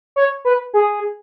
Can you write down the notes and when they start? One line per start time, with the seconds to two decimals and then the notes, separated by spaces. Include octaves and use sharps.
0.16 C#5
0.45 B4
0.74 G#4